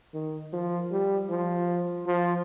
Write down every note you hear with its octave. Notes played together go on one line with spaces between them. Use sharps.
D#3
F3
G3
F3
F3